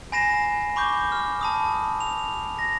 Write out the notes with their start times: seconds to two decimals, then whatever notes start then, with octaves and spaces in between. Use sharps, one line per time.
0.12 G#5 B5 A#6 C7 E7
0.76 B5 C#6 D6 G6
1.12 F6
1.41 A5 B5 D#6
2.01 F7
2.59 A#6